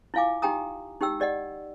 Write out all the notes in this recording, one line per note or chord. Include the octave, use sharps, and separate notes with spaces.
E4 F4 F5 G#5 D6
D#4 G4 G5 G#5 A#5 D#6
D#4 G4 G5 E6
G4 D5 D#5 F#5